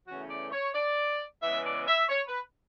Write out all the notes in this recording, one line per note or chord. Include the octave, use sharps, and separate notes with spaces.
E2 C#3 E3 A3 C#4 F#4
D5
C#5
D5
C#3 E3 G#3 B3 E5
D5
E5
C#5
B4